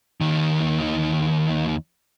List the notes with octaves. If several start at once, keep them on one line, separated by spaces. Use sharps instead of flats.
D#2 D#3